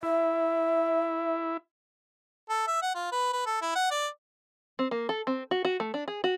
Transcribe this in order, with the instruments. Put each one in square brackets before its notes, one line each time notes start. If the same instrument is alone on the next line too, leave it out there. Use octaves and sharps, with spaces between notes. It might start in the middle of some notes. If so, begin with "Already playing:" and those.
[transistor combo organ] E4 [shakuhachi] E5
[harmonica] A4
E5
F#5
F4
B4
B4
A4
E4
F#5
D5
[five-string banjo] C4
A#3
A4
C4
F#4
F#4
A3
D4
G#4
F#4